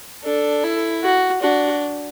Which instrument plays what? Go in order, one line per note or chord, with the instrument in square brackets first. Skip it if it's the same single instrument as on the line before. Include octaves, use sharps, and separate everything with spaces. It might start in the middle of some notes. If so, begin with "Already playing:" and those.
[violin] D4 [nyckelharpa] A4
[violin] E4
[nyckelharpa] F#4
[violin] D4 [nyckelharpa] F#4